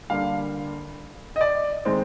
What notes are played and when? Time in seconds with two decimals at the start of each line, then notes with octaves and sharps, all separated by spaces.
0.10 D3 G3 A#3 F5
1.36 D#5
1.41 D5
1.85 D#3 G#3 C4